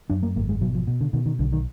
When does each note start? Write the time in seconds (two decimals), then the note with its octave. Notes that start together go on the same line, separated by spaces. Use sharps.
0.10 F#2 D4
0.23 A#3
0.36 G#1 A#3
0.49 G#3
0.61 B2 F#3
0.75 F3
0.87 B2
1.01 D3
1.13 B2 D#3
1.26 D#3
1.39 B1 D3
1.53 D#3